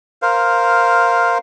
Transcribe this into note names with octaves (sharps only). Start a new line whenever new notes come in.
A#4 C5 F5